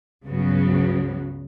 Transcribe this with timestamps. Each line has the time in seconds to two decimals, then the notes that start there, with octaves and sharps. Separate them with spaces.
0.25 C#2 G2 C#3 F#3 B3